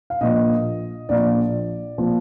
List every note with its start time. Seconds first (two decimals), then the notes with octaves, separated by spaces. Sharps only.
0.10 F5
0.21 A#1 A#2 F3 D#5
1.09 A#1 A#2 F3 D5
1.98 A#2 F3